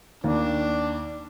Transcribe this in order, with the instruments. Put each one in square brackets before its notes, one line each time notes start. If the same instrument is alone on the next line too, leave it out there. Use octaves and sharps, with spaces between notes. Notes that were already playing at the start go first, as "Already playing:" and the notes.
[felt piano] D#2 [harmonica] D4